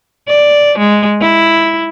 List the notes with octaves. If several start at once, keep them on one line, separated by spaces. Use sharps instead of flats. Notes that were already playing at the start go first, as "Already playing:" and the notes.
D5
G#3
E4